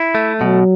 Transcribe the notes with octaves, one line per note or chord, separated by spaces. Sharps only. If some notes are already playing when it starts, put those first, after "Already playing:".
Already playing: E4
A3
B2 F#3